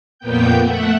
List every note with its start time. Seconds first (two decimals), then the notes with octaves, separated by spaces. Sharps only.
0.19 F2 A#2 A#3 B3 G5 G6
0.60 A3 E5 F#5